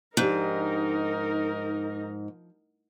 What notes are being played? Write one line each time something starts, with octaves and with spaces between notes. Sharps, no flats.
G#2 F3 D4 D#4 G4 A#4